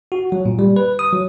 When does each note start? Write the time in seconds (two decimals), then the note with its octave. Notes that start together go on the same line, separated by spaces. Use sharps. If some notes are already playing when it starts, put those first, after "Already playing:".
0.12 F#4
0.32 F#3
0.46 A#2
0.59 G3
0.76 B4
0.99 D#6
1.13 F#3